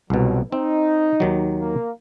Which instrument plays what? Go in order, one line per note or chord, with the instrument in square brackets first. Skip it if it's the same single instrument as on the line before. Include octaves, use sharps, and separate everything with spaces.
[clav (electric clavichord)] C2 B2 [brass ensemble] F2 F#3
[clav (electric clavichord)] C4 [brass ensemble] D#4
[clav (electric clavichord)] D#2 D#3 F#3
[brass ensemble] A#3